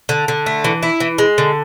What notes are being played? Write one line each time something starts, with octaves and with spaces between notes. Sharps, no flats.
D3
D3
A3
E3
E4
E3
G#3
D3